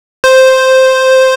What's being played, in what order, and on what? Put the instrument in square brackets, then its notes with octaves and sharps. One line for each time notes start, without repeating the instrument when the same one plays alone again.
[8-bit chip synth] C5